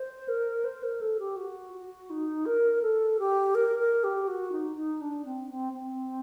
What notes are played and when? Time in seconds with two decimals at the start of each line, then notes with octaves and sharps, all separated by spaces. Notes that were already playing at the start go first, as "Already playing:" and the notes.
Already playing: C5
0.28 A#4
0.65 C5
0.83 A#4
1.01 A4
1.19 G4
1.36 F#4
1.74 F#4
2.10 D#4
2.46 A#4
2.82 A4
3.19 G4
3.55 A#4
3.79 A#4
4.04 G4
4.28 F#4
4.52 D#4
4.76 D#4
5.01 D4
5.25 C4
5.50 C4
5.73 C4